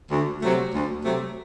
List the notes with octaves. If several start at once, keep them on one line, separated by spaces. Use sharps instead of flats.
D2
C3 F#3 A3
D2
C3 F#3 A3